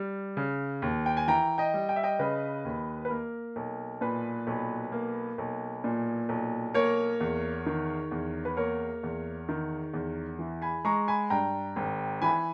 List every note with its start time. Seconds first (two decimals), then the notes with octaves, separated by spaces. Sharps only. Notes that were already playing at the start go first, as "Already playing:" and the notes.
Already playing: G3
0.37 C#3
0.82 D#2
1.06 G5
1.17 G#5
1.28 E3 G5 A#5
1.58 D#5 G5
1.74 G3
1.89 G5
1.96 E5
2.03 D#5 G5
2.19 C#3 B4 D#5
2.65 D#2
3.05 B4
3.10 A#3 A#4
3.56 B1
4.01 A#2 B4
4.47 B1
4.92 A#3
5.38 B1
5.84 A#2
6.29 B1
6.74 A#3 A#4 C#5
7.20 E2
7.66 D#3
8.11 E2
8.45 B4
8.57 A#3 A#4 C#5
9.03 E2
9.49 D#3
9.94 E2
10.39 E3
10.62 G#5 B5
10.85 G#3 A#5 C#6
11.08 G#5 B5
11.30 G2 G5 A#5
11.76 G#1
12.22 E3 G#5 B5